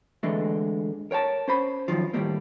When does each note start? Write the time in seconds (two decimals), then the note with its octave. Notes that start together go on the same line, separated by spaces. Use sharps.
0.23 D3 E3 G#3 A3
1.11 A#4 C#5 G5 A5
1.48 C#4 C5 B5
1.88 F#2 B2 D#3 F3
2.13 A2 D#3 G3 A3 A#3